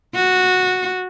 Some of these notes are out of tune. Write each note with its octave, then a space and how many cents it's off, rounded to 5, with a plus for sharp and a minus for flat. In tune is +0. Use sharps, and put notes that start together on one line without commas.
F#4 -10